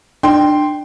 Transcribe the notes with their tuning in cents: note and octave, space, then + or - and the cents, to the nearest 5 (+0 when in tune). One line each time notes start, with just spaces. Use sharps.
D4 +25 G5 +0 C6 +0